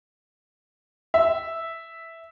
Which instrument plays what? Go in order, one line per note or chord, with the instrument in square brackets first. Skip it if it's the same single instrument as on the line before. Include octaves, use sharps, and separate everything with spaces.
[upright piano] E5